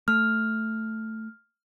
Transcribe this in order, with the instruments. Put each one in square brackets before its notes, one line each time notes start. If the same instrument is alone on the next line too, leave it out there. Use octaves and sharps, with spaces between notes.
[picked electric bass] A3 [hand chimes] F6